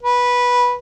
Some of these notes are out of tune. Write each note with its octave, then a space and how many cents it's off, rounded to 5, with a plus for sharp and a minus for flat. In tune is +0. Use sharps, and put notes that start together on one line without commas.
B4 -10